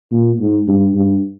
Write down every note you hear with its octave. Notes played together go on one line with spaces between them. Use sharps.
A#2
G#2
G2
G2